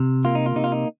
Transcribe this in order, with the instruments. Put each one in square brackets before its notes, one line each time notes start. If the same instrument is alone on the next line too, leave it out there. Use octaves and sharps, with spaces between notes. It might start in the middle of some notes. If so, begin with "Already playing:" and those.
Already playing: [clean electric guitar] C3
A#3 F4
D#4
F4
C3 D#4
F4
D#4